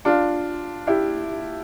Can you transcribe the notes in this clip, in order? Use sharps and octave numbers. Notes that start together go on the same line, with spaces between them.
D4 F4
E4 G4